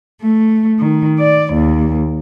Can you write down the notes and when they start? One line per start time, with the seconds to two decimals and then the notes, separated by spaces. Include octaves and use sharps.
0.22 A3
0.80 D#3
1.18 D5
1.53 D#2